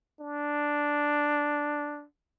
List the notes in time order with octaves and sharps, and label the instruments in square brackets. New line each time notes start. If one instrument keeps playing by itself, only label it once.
[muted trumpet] D4